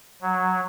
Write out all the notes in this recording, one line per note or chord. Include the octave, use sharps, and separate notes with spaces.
F#3